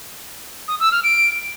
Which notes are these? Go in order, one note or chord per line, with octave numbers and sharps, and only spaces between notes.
D#6
E6
F6
D7